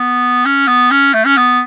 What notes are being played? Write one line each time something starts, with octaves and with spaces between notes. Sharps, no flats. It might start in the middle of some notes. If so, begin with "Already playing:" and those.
Already playing: B3
C#4
B3
C#4
A3
C#4
B3